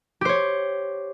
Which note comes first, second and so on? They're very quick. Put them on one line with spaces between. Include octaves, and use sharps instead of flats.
G4 C5 C#5